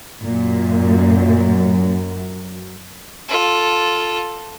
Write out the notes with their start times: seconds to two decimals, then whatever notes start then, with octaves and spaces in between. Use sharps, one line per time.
0.23 F#2 A#2
3.29 F4 A4